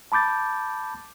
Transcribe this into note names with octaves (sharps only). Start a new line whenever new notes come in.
A5 B5 D6 G6 A6